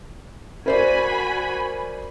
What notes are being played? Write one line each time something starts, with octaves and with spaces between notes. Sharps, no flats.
F#4 A#4 C5 D5 G#5 B5